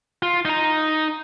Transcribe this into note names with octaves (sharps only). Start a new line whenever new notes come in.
F4
D#4 A#5